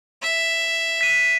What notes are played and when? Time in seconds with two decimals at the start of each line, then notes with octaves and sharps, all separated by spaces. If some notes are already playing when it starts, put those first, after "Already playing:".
0.23 E5
1.01 B6 D#7